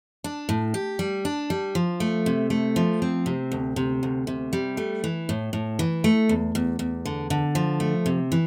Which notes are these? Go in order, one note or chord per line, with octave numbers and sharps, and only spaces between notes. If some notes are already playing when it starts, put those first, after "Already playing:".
D4
A2
G4
G3
D4
G3
F3
A3
C3
A3
F3
C4
C3
D2
C3
D2
C3
G3
A3
E3
A2
A2
E3
A3
E2
E2
E2
D3
D3
F3
A3
C3
E3